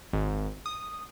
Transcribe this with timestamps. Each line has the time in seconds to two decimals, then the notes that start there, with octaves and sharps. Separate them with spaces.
0.13 G#1
0.66 D#6